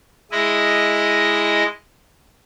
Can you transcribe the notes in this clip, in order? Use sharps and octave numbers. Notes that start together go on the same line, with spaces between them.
G#3 E4 D#5